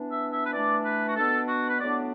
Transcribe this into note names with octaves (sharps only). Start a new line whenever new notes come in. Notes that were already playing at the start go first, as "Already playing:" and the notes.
Already playing: E3 B3 D4
E5
E5
B4
E3 A3 D4 D5
B4
F#4
B2 B3 D4 A4
F#4
B4
A2 F#3 B3 D4 D5